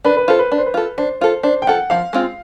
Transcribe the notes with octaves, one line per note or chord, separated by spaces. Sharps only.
D4 B4
B4
F4 A4 C5
B4
D4 B4
C5
B4
F4 A4
D4 C5
F4 A4 C5
D4 C5
G5
F4 A4 F#5
F3 F5
G#3 C4 F4